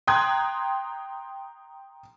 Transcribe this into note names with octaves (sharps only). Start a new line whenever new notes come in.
G5 A#5 C6 D#6 F#6 G#6